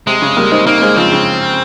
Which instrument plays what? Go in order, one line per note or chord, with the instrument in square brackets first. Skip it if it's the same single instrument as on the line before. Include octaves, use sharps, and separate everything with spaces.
[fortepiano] C3 [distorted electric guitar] G#3
[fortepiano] C#3
G3 A#3
C4 D#4
[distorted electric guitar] A#3 [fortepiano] C4 D#4
[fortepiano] G#3 C4
[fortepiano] C#3 F3 [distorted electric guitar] C4
[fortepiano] C#3